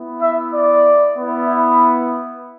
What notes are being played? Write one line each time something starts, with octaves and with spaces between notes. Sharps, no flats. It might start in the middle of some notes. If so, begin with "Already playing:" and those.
Already playing: B3 E4
E5
D5
B3 E4